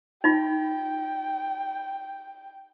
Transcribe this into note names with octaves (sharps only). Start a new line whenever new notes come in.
D#4 F4 G5